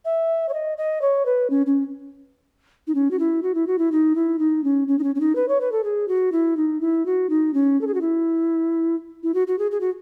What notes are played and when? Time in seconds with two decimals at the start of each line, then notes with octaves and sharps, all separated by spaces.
0.05 E5
0.49 C#5
0.53 D#5
0.77 D#5
1.01 C#5
1.26 B4
1.50 C#4
1.66 C#4
2.87 D#4
2.95 C#4
3.11 F#4
3.19 E4
3.43 F#4
3.54 E4
3.67 F#4
3.78 E4
3.92 D#4
4.15 E4
4.39 D#4
4.64 C#4
4.88 C#4
4.98 D#4
5.03 C#4
5.15 C#4
5.20 D#4
5.35 B4
5.48 C#5
5.61 B4
5.72 A4
5.84 G#4
6.08 F#4
6.32 E4
6.57 D#4
6.81 E4
7.06 F#4
7.30 D#4
7.54 C#4
7.81 A4
7.87 G#4
7.94 F#4
8.01 E4
9.23 E4
9.34 F#4
9.47 F#4
9.58 G#4
9.71 G#4
9.80 F#4